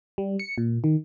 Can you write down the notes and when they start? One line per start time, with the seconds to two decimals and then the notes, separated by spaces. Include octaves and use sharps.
0.18 G3
0.39 C#7
0.58 A#2
0.84 D#3